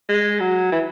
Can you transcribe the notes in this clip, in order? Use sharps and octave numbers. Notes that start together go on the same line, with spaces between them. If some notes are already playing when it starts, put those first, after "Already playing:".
G#3
F#3
E3